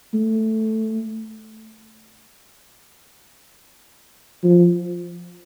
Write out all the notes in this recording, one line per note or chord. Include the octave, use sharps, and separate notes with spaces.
A3
F3